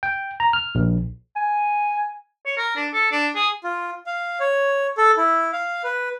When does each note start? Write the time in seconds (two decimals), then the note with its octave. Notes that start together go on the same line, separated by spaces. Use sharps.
0.03 G5
0.40 A#5
0.53 F6
0.75 A#1
1.36 G#5
2.46 C#5
2.58 A#4
2.76 D4
2.94 A4
3.12 D4
3.35 G#4
3.64 F4
4.06 F5
4.40 C#5
4.98 A4
5.17 E4
5.52 F5
5.84 B4